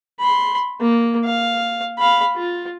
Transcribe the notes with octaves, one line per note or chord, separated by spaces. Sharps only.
B5 C6
A#3
F5
F5 B5
F4